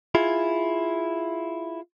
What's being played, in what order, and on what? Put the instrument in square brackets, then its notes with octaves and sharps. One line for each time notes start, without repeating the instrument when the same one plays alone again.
[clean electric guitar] E4 F4 G#4